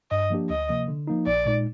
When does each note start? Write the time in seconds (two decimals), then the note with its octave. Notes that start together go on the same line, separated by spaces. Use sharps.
0.11 G2 D#5
0.30 F3 A#3 D4 G4
0.50 D2 D#5
0.69 C3 F3 A#3
0.88 D3
1.07 F3 A#3 D#4
1.27 A#1 D5
1.46 A#2 G#3 D#4